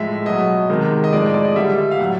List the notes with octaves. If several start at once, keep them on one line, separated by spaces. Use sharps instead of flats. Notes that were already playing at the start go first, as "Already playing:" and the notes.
Already playing: A2 F3 G#3 E5
B2 F#3 D#5
C3 D#3 G#3
D#5
A2 F3 G#3 D5
D5
D#5
D3 G3 E5
F5
A2 F#3 F#5